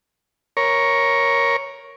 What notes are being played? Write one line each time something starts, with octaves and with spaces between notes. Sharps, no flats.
A#4 C#5